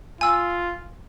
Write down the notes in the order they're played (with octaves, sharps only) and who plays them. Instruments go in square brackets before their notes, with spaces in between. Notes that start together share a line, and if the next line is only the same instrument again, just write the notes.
[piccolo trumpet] F4 [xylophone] G#5 E6